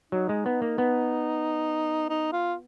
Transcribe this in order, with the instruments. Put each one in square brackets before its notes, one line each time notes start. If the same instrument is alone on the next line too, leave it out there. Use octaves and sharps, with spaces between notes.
[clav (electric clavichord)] F#3 [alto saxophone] D#4
[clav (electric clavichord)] G#3
B3
A#3
B3
[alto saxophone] D#4
F4